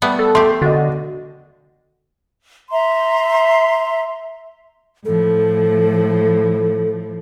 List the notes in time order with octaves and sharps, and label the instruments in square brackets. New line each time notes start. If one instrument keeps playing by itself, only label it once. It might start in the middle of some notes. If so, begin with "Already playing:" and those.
[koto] G3 A3 B3
[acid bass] A4
[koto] A3 G4 [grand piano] C6
[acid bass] D3 [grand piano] F#4 D#5
[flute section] E5 A#5 C6
[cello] A2 F3 [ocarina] A4